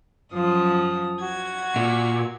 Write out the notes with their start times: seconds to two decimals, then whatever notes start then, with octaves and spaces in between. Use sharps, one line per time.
0.33 F#2 F3 D#6
1.22 F#4 G#6
1.76 A#2